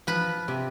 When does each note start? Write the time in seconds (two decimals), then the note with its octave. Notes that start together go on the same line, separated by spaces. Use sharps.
0.07 F3 B4
0.48 C3